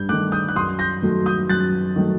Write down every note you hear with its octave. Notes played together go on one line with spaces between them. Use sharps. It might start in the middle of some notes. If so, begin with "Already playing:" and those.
Already playing: G2 G6
D#3 A3 D6 F#6
D#6 G6
F#6
F#2 C6 D#6
G6 A#6
D#3 F#3 A3
D#6 G6
F#2 F#6 A6
D#3 F#3 A3